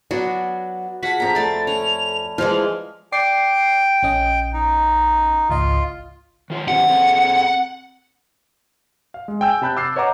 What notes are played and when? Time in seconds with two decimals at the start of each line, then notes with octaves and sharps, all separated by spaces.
0.11 F#3 B3 D4 F#4
1.03 F4 F#4 G#4 F#5 A5 B6
1.20 F2 A#5
1.35 A3 D5 F5 A5 B5 A6
1.67 C#4 F7
2.38 E3 F3 G#3 F4 F6
3.12 D5 G5 D6 C7
4.03 A#1 C#4 D#5
4.53 D#4
5.49 G#1 C#2 F4 D#5
6.50 D#3 F4 C#5
6.68 D#3 C4 G4 F#5
6.89 C4 G#4 A4
9.14 F5
9.28 G#3
9.41 G5 G#5 E6 G6
9.62 C3 A5 B5 F#6 G6
9.77 D6 E6 F6 A6 C7
9.96 B4 C#5 D#5 F#5 A#5 D6